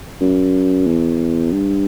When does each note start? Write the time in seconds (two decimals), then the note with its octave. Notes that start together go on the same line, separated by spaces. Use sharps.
0.21 F#2
0.87 E2
1.52 G2